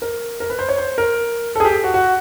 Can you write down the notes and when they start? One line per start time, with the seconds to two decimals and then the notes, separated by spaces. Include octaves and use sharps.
0.02 A#4
0.40 A#4
0.50 B4
0.59 C5
0.69 C#5
0.78 C5
0.98 A#4
1.55 A4
1.60 G#4
1.65 G4
1.83 F#4
1.94 F#4